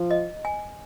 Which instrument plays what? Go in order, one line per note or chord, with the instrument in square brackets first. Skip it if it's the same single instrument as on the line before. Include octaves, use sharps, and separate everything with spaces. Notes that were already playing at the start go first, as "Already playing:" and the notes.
Already playing: [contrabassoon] F3
[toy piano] D#5
G#5